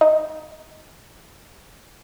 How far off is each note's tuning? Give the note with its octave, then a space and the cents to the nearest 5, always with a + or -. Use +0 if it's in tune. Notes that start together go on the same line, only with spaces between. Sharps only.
D#4 +0 D#5 +0